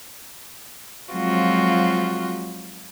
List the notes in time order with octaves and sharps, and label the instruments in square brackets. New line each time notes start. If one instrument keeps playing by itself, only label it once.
[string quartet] F3 F#3 G#3 C4 F4 F#4